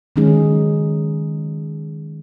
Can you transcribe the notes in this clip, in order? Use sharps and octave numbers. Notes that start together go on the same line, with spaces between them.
D#3 F#3 G#3 C#4 D#4 G#4